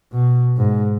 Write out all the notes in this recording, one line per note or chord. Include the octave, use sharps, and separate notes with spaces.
B2
G#2